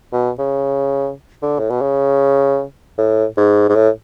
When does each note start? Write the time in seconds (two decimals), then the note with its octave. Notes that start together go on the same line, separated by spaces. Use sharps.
0.13 B2
0.38 C#3
1.42 D3
1.59 A2
1.70 B2
1.82 C#3
2.98 A2
3.37 G#2
3.69 G#2
3.76 A2